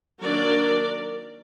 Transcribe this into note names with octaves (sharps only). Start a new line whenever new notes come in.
D#3 F#3 A#3 D4 A#4 D5